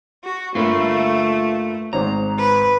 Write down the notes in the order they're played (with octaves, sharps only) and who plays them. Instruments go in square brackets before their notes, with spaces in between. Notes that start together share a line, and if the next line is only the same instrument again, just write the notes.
[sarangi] F#4
[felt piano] G2 A#3 [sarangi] A3 [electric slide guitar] F4 B4
[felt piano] G#1 G#2 C5 [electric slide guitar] A#5
[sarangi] B4